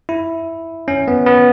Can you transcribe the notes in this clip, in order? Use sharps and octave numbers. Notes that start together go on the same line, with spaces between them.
E4
C#4
B3
B3